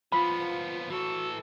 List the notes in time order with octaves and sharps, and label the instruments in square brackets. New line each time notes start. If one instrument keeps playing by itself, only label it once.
[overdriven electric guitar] F3 B3 [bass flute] F4 [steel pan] B5
[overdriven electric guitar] E3 A4 [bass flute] F#4